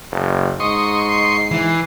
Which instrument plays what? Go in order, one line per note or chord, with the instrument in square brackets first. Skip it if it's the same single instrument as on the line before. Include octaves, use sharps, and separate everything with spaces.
[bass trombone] F#1
[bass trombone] G#2 [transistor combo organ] D#5 C6 C#6 [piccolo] D#6
[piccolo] C7
[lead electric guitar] E3